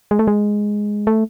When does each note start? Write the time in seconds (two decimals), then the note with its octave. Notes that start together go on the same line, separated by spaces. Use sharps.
0.11 G#3
0.19 A3
0.27 G#3
1.07 A3